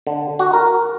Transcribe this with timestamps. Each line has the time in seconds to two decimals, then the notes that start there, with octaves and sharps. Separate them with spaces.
0.07 D3
0.39 F#4
0.53 A#4